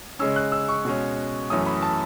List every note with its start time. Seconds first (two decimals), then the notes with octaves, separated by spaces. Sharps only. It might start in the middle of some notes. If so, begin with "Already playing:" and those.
0.19 C#3 G#3 C#4 E6
0.36 F#6
0.52 E6
0.68 C#6
0.85 B2 G#3 C#4
1.50 F#2 E3 A3 C#4 D#6
1.66 B5
1.83 A5